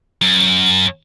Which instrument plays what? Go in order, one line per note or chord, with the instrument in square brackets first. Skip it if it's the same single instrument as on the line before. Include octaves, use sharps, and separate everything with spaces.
[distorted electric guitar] F#2